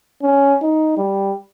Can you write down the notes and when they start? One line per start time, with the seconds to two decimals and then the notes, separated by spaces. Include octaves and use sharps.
0.23 C#4
0.62 D#4
0.97 G3